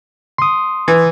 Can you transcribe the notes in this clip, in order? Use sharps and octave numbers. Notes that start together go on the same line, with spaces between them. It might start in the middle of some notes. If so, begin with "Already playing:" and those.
C6 D#6
E3